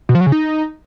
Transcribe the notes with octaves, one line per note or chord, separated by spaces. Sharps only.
B2
F3
F#3
C#3
D#4